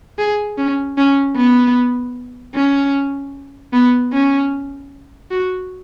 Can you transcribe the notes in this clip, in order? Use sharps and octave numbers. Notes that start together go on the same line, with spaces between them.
G#4
C#4
C#4
B3
C#4
B3
C#4
F#4